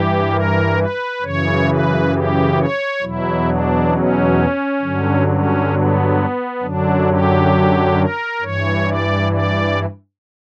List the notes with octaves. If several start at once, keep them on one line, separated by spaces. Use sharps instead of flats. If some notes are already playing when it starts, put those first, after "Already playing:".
Already playing: G2 E3 G4
A#4
B4
F#2 C#3 E3 C#5
B4
G4
C#5
E2 B2 F#3 E4
D4
C#4
G2 D3 F#3
C#4
B3
F#2 D3 F#3 D4
G4
A#4
G2 E3 C#5
D5
D5